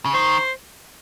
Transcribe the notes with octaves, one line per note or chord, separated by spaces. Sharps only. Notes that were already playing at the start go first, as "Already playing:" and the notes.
C#3
D#3 C5